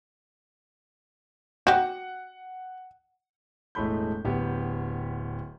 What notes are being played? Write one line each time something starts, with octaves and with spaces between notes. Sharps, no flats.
F#4 G4 F#5
E1 A2 G#3 A3 B5 G6
D1 B3 G4